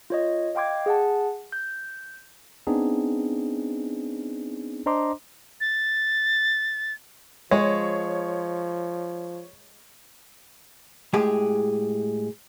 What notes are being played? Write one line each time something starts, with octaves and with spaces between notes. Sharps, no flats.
F4 C#5 D#5
D#5 F5 G5 C6 D6 G#6
G#4 F#5 A5
G6
B3 C4 D4 D#4 G#4
D4 C5 D#5 A#5 C6 D6
A6
F3 G#3 C#5
A2 G#3 G4 G#4